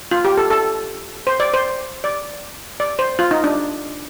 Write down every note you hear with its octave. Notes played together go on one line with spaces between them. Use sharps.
F4
G4
A4
A4
C5
D5
C5
D5
D5
C5
F4
D#4
D4